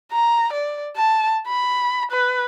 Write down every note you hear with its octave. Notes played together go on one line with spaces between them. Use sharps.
A#5
D5
A5
B5
B4